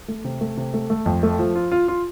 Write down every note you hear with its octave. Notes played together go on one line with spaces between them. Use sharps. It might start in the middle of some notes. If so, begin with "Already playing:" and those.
A3
C3
A3
C3
A3
A3
F2
A3
F3
F4
F4
F4